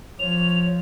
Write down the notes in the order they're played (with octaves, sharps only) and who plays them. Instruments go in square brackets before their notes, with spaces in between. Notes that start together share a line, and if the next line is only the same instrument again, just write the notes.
[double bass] F3 [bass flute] C#5 [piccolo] F7